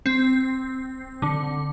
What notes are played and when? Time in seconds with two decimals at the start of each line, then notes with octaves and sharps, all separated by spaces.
0.06 C4
1.22 D3